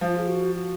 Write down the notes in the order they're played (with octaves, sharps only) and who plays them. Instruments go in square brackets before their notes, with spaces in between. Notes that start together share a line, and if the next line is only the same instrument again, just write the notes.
[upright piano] F3 [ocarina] F4
[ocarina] G#4
F#4
F#4